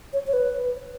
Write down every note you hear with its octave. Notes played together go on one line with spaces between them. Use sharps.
C#5
C#5
B4